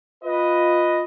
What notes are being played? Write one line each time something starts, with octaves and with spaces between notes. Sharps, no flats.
F4 B4 D#5